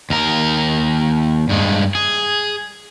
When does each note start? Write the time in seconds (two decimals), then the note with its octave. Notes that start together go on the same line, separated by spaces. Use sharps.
0.10 D#2 A#4
1.49 G2 G#3
1.95 G#4